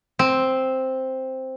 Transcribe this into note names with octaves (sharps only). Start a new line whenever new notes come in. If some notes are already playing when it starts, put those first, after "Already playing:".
C4